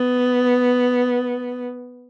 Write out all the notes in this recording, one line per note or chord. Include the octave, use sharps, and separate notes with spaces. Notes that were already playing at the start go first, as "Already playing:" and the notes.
Already playing: B3